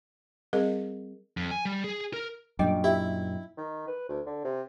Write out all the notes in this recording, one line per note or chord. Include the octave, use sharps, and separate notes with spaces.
G3 C4 G#4 A#4 D#5
F2
G#5
G3
G#4
A#4
F#2 A#2 G3 D4 D#5 G5 D6
E4 G4 E5
D#3
B4
D2
D3
C3